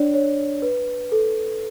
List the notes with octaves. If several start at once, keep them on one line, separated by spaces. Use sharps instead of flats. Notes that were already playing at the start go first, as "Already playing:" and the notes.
Already playing: D4 C#5 D5
C#5
B4
A4